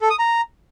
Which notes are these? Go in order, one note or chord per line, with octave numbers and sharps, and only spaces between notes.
A4
D#6
A#5